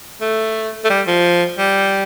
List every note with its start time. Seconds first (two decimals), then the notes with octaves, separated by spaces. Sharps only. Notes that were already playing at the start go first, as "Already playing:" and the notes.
0.21 A3
0.85 A3
0.90 G3
1.07 F3
1.58 G3